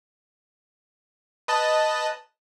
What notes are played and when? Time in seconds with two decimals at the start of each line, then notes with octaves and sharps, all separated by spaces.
1.48 B4 D#5 A5